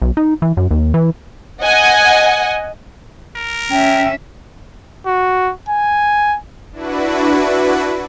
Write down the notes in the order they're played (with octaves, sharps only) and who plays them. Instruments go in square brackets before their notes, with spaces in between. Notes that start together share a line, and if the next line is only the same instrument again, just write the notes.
[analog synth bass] B1
D#4
E3
F#2
D#2
E3
[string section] D#5 F#5 G#5
[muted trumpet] A#4
[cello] C#4 E5 [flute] G5
[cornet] F#4
G#5
[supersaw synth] D4 E4 F#4 B4